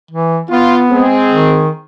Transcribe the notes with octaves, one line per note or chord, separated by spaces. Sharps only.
E3
B3 F4
G#3 C4 G#4
D#3